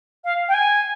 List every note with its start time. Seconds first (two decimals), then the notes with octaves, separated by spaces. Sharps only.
0.24 F5
0.48 G5
0.54 G#5